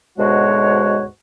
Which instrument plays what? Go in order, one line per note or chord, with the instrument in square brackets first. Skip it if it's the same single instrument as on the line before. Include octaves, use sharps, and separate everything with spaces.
[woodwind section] D2 G#2 B2 G#3 F#4 C#5